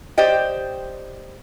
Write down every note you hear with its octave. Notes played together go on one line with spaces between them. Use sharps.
G4 C5 D5 D#5 G5